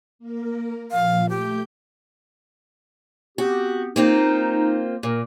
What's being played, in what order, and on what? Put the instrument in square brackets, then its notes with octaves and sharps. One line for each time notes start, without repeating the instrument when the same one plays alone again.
[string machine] A#3 A#4
[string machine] A#2 F3 [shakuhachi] F5
[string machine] A3 G6 [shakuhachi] G4
[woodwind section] B3 C4 G4 [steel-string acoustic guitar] F#4
[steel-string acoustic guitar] A#3 C4 F4 [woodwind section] D#4
[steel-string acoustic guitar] A#2 [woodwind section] A#4